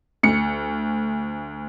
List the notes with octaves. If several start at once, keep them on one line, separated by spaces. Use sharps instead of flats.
D2 C#7